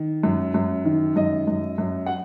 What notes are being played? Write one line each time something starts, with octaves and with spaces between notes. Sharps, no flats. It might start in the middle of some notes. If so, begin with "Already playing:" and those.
Already playing: D#3
F#2
F#2
D#3
F#2 D#5
F#2
F#2
F#5